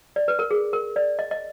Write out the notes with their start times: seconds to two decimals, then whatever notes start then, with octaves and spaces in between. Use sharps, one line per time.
0.16 D5
0.28 B4
0.39 A#4
0.51 G#4
0.73 A#4
0.96 D5
1.19 D#5
1.31 D#5